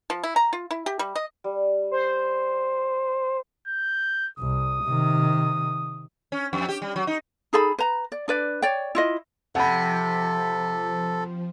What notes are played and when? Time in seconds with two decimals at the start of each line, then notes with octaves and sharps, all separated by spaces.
0.10 F3
0.23 E4
0.36 A#5
0.53 F4
0.71 E4
0.86 G4
0.99 G3
1.16 D#5
1.44 G3
1.91 C5
3.68 G6
4.39 C2 D#6
4.85 C3 D#3
6.32 C#4
6.53 F2
6.69 G4
6.82 G3
6.96 F#3
7.07 D#4
7.53 D#4 G#4 A4 B5
7.79 B4 A#5
8.12 D5
8.28 D4 B4 D5
8.62 C#5 D5 G5
8.95 E4 F4 D#5
9.55 C3 F3 A4 F#5 B5